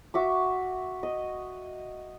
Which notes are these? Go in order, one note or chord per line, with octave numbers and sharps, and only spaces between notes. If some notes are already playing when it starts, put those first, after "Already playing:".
F#4 E5 D6
D#5